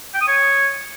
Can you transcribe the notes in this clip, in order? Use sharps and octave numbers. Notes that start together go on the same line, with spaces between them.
G5
D#6
C#5